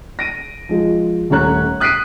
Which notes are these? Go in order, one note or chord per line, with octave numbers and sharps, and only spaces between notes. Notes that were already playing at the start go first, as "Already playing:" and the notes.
A#6 D7 D#7
F3 G#3
D#1 A3 C#4 C#5 A#5 F#6
D#6 F#6 B6 C7 D7 D#7